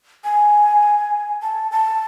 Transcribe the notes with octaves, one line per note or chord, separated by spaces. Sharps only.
G#5
A5
A5